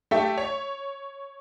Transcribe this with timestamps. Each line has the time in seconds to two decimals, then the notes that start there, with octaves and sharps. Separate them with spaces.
0.11 A3 G4 E5
0.38 C#5